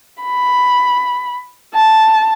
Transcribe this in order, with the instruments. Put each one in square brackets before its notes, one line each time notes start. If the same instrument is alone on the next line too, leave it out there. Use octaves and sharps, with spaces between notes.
[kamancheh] B5
A5